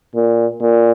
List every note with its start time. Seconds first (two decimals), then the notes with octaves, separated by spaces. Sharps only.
0.16 A#2
0.61 A#2